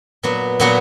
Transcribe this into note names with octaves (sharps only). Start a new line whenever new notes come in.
A#2 F#3 B3 F#4
A#2 F#3 B3 F#4